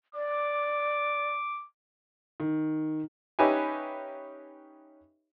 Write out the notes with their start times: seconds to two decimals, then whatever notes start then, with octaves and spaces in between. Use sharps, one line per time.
0.15 D5 D6
2.40 D#3
3.39 C#4 D#4 G4 B4 E5 G#5